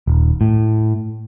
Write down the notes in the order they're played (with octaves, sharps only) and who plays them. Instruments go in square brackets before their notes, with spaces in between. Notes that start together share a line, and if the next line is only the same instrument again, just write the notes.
[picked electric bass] D#1
A2